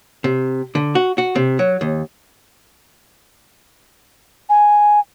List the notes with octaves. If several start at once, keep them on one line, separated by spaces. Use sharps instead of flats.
C3
D3
F#4
F#4
C3
F#3
D#2
G#5